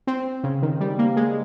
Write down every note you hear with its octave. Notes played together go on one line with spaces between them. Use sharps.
C4
C#3
D#3
G3
A#3
G#3